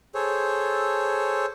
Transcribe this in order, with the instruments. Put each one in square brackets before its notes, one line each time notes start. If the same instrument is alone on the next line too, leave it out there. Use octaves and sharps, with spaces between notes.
[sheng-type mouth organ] G#4 A4 C5 C#5